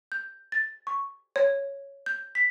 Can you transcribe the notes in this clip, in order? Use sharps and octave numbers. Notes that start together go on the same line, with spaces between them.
G6
A6
C#6
C#5
G6
B6